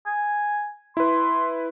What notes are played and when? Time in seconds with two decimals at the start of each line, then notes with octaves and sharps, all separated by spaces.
0.06 G#5
0.97 E4 B4 C6